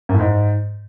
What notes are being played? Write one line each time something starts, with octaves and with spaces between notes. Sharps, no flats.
F#2
A2
G#2